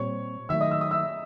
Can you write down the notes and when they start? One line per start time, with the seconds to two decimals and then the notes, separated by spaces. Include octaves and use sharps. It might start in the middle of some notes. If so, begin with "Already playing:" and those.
Already playing: A#2 G3 C4 C#5 C#6
0.49 D#3 F#3 A3 E5 E6
0.61 D#5 D#6
0.71 E6
0.81 D#6
0.91 E5 E6